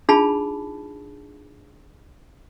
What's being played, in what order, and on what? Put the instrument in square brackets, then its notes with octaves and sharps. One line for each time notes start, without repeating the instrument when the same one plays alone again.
[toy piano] D4 D#4 F4 G#4 A5 B5